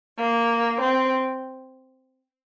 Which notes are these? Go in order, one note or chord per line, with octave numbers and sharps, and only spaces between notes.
A#3
C4